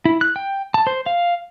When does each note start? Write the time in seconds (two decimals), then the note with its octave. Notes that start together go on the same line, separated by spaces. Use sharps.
0.05 E4
0.21 F#6
0.36 G5
0.74 A5
0.87 C5
1.06 F5